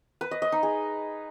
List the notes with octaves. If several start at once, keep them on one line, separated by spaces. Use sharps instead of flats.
B4
D#5
D#5
D#4
G#4